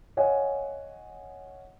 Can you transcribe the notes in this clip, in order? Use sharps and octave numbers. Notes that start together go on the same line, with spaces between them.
C#5 D#5 F5 F#5 G#5